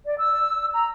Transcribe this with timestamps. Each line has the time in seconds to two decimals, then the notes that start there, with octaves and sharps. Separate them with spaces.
0.05 D5
0.17 E6
0.72 A#5